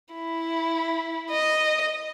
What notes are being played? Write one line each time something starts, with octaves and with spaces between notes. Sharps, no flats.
E4
D#5